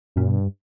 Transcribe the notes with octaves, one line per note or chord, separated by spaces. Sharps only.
F#2 A#2
G2 B2